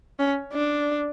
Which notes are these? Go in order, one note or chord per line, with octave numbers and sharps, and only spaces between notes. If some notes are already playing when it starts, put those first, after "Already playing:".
C#4
D4